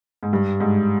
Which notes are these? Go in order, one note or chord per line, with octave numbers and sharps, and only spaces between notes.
G#2
G2
G#2